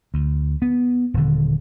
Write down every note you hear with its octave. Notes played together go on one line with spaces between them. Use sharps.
D2
B3
D#1 D3